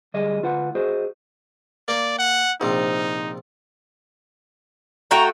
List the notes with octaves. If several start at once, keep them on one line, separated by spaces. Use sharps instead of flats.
D2 G3 G#4 D#5
D2 F4 B4 F#5
F#4 G#4 C5 D#5
A#3 D5
F#5
A#1 C3 D#4
A3 F#4 G5 A#5